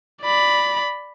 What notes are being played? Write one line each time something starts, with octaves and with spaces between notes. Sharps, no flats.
D5 B5